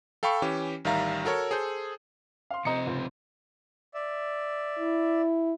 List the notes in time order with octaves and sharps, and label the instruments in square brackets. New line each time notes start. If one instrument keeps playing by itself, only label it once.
[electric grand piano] A4 F5 G5 B5 C#6
E3 C#4 G4
A1 D#3 G3 E5 F5 A#5
F#4 A4 A#4 C#5
G#4 A4 C5 G6
[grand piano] F5 C6
[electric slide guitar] C3 F3 C4 [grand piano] D#5 A#5 C#7
[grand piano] C#2
[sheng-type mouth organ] D5 E5
[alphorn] E4